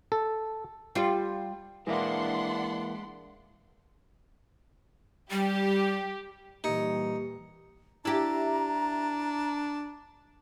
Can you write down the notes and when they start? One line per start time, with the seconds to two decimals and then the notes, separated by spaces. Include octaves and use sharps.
0.12 A4
0.95 G3 F4
1.87 E3 G#3 A#3 D4 E4 F#5 C6
5.31 G3 G4
6.64 A#2 E3 G3 A#3 D#4 G4 C#7
8.05 D4 E4 G4 A#5